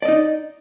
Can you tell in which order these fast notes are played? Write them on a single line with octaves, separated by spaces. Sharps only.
D5 D#5 D#4